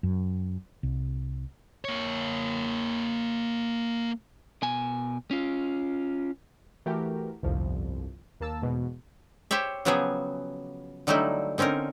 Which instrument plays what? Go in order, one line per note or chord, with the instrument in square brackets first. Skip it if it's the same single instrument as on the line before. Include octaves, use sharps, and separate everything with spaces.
[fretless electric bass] F#2
C2
[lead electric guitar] A#3 C#5
B2 G#5
C#4 F4
[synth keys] E3 A3 F#4 G4 A#4
G1 C2 F2 F3
D#2 A#3 A5 E6
E2 G#2 B2
[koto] G4 C5 C#5 E5
C#3 F3 F#3 B3 G4 G#4
D3 F#3 G3 A3 D#4 E4
D3 C4 C#4 D#4 A#4